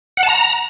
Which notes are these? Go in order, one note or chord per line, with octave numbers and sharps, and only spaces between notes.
F#5
A5
A#5